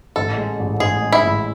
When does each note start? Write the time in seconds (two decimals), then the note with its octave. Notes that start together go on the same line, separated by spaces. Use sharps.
0.16 A1 A4
0.37 G#3
0.59 A1
0.80 A1 G#4
1.01 G#3
1.12 E4
1.23 A1